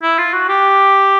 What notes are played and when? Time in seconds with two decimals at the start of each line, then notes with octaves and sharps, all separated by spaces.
0.03 E4
0.18 F4
0.33 F#4
0.49 G4